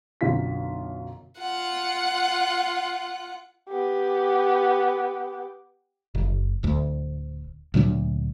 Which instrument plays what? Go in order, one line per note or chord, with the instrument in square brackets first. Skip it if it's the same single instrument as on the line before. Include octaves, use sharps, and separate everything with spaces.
[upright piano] B1 F#2 D3 F4 B6
[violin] F4 F#5
[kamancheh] B3 G4
[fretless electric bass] F#1
D1 D2
D2 A#2 F#3 D4